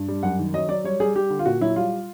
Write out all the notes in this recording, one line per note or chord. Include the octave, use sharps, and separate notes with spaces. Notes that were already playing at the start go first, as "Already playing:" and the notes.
Already playing: G2
G3
F#2 F#5
D#3
F#3 D#5
F#3 D5
G3 C#5
G3 G#4
G3 G4
D3
F4
A#2 F#4
F#3 E4
G3 F4